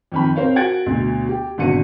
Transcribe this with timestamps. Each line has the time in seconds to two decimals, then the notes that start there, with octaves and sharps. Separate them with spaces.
0.12 F2 D#3 B5
0.36 C4 A#4 C5 C#5 F5
0.55 F#4 A#4 F#5 G#6 A6 D7
0.86 D2 B2
1.29 G4
1.58 G#1 B2 D3 F#4 C#7 D#7